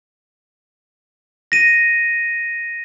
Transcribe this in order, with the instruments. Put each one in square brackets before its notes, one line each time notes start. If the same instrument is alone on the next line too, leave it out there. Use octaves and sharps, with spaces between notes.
[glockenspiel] A#6 D#7